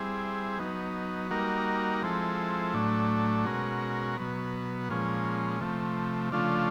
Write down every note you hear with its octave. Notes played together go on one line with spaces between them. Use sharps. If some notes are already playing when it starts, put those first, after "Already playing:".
Already playing: G3 C4 E4 G#4
F#3 B3 D#4
G3 A#3 D#4 F#4 A#4
F3 G#3 C4 E4 A4
A2 F#3 A3 D4
B2 G#3 C#4 F#4 A#4
B2 F#3 B3
A#2 F3 G#3 C#4
C3 F3 A3
C#3 F3 A3 D4 F4